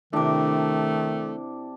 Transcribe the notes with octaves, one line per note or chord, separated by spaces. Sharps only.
C3 D#3 A3 D4 E4 D6